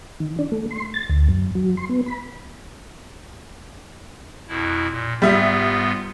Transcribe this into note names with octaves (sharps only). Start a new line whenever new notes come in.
D#3
D4
A3
C6
A6
D2
F#2
F#3
C6
B3
B5
F2 B2 E4
A#2
G#2 G3 B3 F4 E5